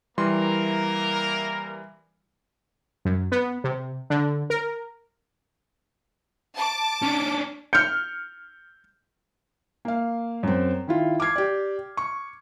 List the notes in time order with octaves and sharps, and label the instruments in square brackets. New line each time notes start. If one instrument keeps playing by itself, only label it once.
[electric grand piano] E3 G3 C6 [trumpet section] A#3 E4 A#4
[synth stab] F#2
B3
C3
D3
A#4
[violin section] A5 D6
[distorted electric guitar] C#4 D4
[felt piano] F6 C#7 [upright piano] G6
[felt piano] A#3 F5
F#2 C4
D#3 E4 F4
D6 F6 G#6 C7
G4 D5
C#6